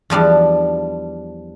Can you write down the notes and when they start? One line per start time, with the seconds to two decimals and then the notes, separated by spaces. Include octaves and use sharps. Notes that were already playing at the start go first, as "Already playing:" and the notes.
0.10 E2 F3 G3 D4